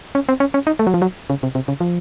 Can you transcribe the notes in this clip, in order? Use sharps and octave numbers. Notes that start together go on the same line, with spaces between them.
C#4
C4
C#4
C#4
D#4
A3
F#3
F3
F#3
C#3
C3
C3
C#3
F3